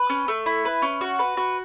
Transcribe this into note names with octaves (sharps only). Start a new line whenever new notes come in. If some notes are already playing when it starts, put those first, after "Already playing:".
Already playing: B4
C#4
A3
E4
B4
C#4
F#4
B4
F#4